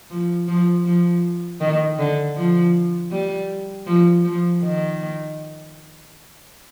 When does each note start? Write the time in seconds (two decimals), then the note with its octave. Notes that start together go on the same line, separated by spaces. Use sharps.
0.10 F3
0.48 F3
0.85 F3
1.61 D#3
1.99 D3
2.36 F3
3.11 G3
3.87 F3
4.25 F3
4.62 D#3